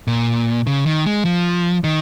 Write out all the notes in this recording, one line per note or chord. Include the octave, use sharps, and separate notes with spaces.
A#2
C#3
D#3
G#3
F3
D#3